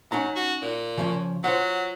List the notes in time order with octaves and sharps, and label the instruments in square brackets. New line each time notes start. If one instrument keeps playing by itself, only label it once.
[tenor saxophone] F#3 [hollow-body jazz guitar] C#4 D#4 A#5
[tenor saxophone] F#4
A#2
[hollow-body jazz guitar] C#3 F3 C#4
[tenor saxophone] F#3 [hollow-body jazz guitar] F4 C5 F#5